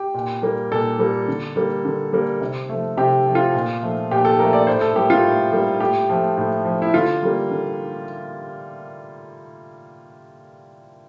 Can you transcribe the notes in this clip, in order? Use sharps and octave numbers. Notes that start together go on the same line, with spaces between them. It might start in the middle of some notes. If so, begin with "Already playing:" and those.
Already playing: G4
A#2
G3 A#3
A#2 A4
G3 A#3
D3
G3 A#3
D3
G3 A#3
C3
F3 A3
C3 G4
F3 A3
F4
A#2
F3 A3
A#2 G4
A4
F3 A3 A#4
D5
A2 C5
A4
G3 A#3 G4
F4
A2
G3 A#3
A2 G4
F3 A3
A2
F3 A3
E4
D3 F4
G3 A#3
D3